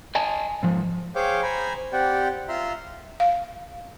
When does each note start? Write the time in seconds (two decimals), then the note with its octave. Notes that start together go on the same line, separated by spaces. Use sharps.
0.15 D#5 G#5 A5
0.63 G#2 F3
1.15 G#4 C5 C#5 F5 G5 D6
1.43 C5 G#5 A#5 B5
1.93 C4 G4 D5 F#5 G5
2.49 F4 E5 A#5 C6
3.20 F5